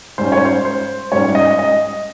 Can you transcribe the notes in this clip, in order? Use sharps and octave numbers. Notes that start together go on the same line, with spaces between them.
G#2 G3 C#4 C5
C#5
C5
C5
G#2 G3 C#4 C#5
D#5
D#5